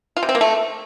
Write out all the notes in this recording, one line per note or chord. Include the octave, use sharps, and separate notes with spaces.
F4
C3
C4
A#3
A3